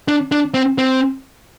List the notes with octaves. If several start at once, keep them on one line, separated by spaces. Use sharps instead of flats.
D4
D4
C4
C4